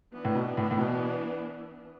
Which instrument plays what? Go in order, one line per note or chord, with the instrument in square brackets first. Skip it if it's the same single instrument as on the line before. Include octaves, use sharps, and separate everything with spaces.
[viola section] E3 B3 D4
[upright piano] A2
B2
A2
A2
B2